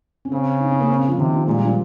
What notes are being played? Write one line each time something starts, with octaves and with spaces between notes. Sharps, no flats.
C#4
C#3 C4
D#4
C#4
A#3
C4
C#4
F3
C3 D#3
F3
A#2 G#3
G3
F3